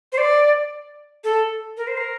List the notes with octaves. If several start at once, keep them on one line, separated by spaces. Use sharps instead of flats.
C5
D5
A4
A#4
C5
A#4